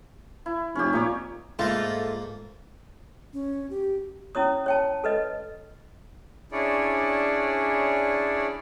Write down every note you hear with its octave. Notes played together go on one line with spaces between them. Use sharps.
E4
F1 C#4 G4
A#2 D#4 C#5
G#2 A3 A#3 F4
C#4
G4
C#4 E4 C#5 D#6
C#5 G5 A5
A4 B4 D#5
C#4 D4 E4 G#4 C#5 D5